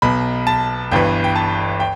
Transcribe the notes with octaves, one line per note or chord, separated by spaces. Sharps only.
B1 B2 B5
A5
G1 G2 E3 G5
G5
A5
G5